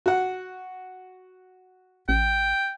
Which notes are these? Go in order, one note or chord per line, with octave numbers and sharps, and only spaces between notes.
F#4 F#5
A1 G5